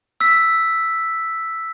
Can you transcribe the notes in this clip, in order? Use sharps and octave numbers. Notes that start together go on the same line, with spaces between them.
E6 B6